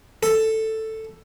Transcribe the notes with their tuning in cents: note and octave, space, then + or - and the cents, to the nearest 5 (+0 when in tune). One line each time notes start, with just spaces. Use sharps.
A4 +5